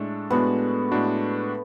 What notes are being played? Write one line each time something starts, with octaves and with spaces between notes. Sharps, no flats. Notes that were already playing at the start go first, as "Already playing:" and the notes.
Already playing: A2 G#3 A3 D4 A4
A2 G#3 B3 D4 F#4
A2 G#3 D4 F#4